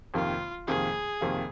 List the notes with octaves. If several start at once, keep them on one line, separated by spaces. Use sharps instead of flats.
F2 C3 D#3 A#3 F4
F2 C3 D#3 A#3 G#4
F2 C3 D#3 A#3